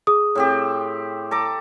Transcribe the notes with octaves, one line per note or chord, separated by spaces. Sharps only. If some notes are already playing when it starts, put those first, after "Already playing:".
G#4 D#6
A2 C4 G4
A4 A#5 D6